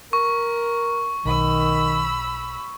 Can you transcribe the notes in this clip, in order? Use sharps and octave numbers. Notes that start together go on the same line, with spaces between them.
A#4 C#6
B1 D#3 B5 E6